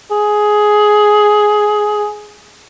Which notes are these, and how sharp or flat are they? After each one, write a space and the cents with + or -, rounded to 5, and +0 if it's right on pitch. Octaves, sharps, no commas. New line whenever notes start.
G#4 +10